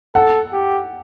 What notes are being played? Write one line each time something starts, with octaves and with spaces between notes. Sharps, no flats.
A4 F#5
G4